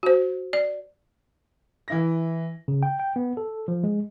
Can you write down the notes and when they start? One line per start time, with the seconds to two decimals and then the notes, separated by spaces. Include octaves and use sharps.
0.03 F#4 C5
0.53 D5
1.88 E3 E4 A#6
2.68 C#3
2.83 G5
3.00 G5
3.16 B3
3.37 A4
3.68 F3
3.84 G#3